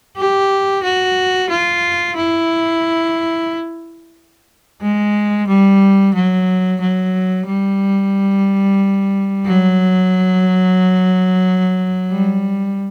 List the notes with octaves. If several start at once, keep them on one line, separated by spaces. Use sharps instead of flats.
G4
F#4
F4
E4
G#3
G3
F#3
F#3
G3
F#3
G3